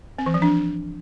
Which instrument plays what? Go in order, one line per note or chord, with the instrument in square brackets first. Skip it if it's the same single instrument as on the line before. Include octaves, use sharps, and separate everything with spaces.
[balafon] C4
E3
F3
D4